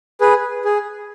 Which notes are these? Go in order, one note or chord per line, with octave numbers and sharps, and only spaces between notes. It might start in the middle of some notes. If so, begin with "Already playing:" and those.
G#4 B4
G#4